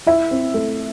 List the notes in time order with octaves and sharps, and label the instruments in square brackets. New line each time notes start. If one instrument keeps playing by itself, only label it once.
[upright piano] E4 E5
C4
A3